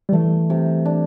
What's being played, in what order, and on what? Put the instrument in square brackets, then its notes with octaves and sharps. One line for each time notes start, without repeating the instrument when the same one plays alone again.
[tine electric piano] G3
[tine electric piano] E3 [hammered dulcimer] A3
[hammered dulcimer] C3
D4